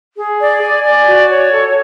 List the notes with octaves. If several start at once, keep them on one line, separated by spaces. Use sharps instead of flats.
G#4
D5
G#5
D5
F#4
C#5
A4